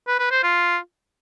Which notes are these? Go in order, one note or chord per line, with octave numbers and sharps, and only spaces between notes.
B4
B4
C5
F4